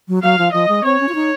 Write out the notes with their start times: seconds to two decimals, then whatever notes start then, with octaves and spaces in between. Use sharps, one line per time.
0.08 F#3
0.23 F#3 F5
0.38 F3
0.53 F3 D#5
0.68 G#3
0.84 C4 C#5
1.00 C#4
1.09 F4
1.15 D#4